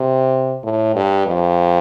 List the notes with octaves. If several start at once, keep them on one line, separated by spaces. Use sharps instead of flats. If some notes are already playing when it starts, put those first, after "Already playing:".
Already playing: C3
A2
G2
F2